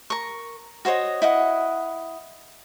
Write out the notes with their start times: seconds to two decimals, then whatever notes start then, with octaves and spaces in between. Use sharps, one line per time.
0.10 A#4 C#6
0.85 F#4 C5 C#5 D#5
1.22 E4 D#5 F#5